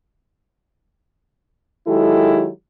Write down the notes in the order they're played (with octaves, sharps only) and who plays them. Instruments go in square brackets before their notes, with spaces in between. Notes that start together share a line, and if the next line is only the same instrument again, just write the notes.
[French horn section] D#3 F#3 G#3 E4 G4 A4